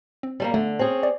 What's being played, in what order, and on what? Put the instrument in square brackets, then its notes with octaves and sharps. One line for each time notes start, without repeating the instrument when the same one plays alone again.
[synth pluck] C4
[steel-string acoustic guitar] G3 A3 A#3
[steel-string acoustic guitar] D3 [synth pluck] A3
[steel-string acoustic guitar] C4 C#4 G#4
[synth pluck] D5